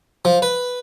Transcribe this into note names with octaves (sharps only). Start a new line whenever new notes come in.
F3
B4